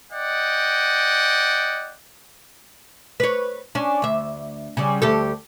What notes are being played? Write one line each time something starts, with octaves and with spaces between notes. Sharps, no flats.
D5 D#5 F#5 G5
B4 C#5
C#4 D4
D2 E5
C#3 G3
D2 G4 A4